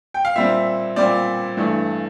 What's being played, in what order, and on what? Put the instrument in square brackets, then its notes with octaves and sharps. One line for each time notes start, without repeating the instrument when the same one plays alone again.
[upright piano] G5
F5
A#2 G3 C4 E5
A#2 G3 C4 D5
G2 E3 A3